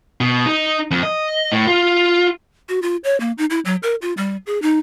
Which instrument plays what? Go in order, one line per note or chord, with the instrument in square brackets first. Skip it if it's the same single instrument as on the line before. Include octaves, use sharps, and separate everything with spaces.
[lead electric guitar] B2
D#4
F2
D#5
A2
F4
[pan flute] F#4
F4
C#5
A#3
D#4
E4
F#3
A#4
F4
G3
G#4
D#4